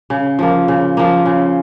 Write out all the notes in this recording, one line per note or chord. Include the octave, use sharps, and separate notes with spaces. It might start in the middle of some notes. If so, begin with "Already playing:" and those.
C#3
F3 A#3
C#3
F3 A#3
C#3